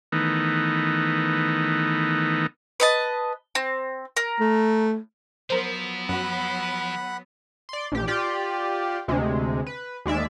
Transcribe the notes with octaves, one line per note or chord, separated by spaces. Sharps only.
D#3 E3 A3 B3 D#4
B4 D#5 A5
C4
A#4
A3
F3 F#3 B3 A#4 C5
F#2 F#4 F#5 B5
D5 C6
A#1 G4
F4 G4 D5
D2 C3 G#3
B4
D#2 G#3 D5 E5